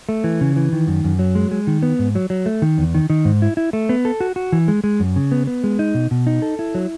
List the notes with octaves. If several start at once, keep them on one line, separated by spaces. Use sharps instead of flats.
A3
E3
C#3
E3
D#3
F#2
F#2
F#3
G#3
G#3
D#3
B3
G#2
F#3
F#3
A3
D#3
E2
D#3
D#3
G#2
E4
E4
A3
B3
A4
F#4
F#4
E3
G#3
G#3
F#2
C#3
B3
B3
G#3
D#4
B2
B2
D#4
A4
E4
F#3